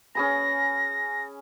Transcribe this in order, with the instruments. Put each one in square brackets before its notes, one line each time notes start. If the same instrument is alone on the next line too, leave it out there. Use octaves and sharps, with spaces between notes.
[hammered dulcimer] C#4 G#4 B5 [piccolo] A#6